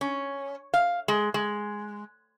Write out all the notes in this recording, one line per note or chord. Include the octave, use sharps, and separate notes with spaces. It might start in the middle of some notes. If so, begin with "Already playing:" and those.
C#4
F5
G#3
G#3